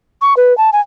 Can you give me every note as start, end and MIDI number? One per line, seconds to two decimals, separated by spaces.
0.22 0.34 85
0.37 0.56 71
0.58 0.70 81
0.73 0.81 80